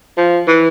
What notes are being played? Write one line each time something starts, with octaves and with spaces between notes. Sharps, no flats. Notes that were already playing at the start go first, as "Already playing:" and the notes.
F3
E3